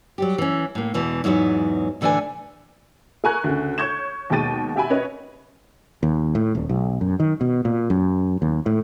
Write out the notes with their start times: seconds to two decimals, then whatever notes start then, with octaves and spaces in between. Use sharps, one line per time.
0.18 F#3 G3 G4
0.38 E3 C#4
0.75 A2 A#3
0.94 E2 B2 E3 G#3
1.24 E2 G#2 F#3 B4 C#5
2.01 A2 D3 E3 D4 B4 G#5
3.24 G#4 A#4 G#5 A#5 C#6 F#6
3.44 D2 C#3
3.78 C#5 C#6 G6 G#6 E7
4.30 D#2 B2 G#3 G5 A6 D#7
4.76 F#4 G4 E5 G5 G#5 B5
4.90 C#4 B4 C#5 D#5
6.03 D#2
6.35 A2
6.55 D#1
6.69 B1
7.01 F#2
7.20 D#3
7.41 B2
7.65 A#2
7.90 F#2
8.42 D#2
8.66 A2